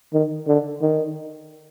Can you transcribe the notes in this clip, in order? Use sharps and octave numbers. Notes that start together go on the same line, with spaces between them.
D#3
D3
D#3